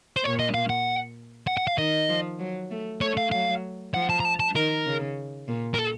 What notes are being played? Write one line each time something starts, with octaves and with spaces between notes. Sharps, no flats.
C5
A#2 C#5
D#5
F5
F#5
F#5
F#5
F5
D#3 D#5
F3
F#3
A3
A3 C#5
F5
F#3 F5
F3 F#5
A5
A#5
A5
A5
D#3 A#4
C#3
A#2
A#4
A4